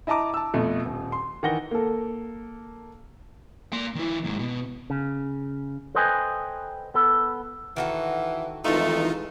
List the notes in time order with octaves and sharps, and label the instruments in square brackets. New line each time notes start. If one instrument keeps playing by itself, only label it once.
[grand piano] E4 D#5 A5 A#5 D6
A5 E6
F2 B2 A3
D#1
C6
D#3 E3 F#5 A#6 G7
A#3 A4
[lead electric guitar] A#3 C6
D#3 E4
D#2 G#2
B2
[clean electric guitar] C#3
A4 B4 C5 D#5 G5 G#5
B3 A4
[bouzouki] D#3 F#4 A4 [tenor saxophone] E3
[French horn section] F2 D#3 E3 [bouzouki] G#3 A4 [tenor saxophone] A3 [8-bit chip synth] D#4 F4